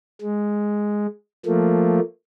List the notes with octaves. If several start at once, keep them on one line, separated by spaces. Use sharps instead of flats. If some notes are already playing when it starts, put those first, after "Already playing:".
G#3
F3 A3 A#3